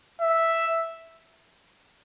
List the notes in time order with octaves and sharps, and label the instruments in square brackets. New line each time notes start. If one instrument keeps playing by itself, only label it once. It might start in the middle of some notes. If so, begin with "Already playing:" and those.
[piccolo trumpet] E5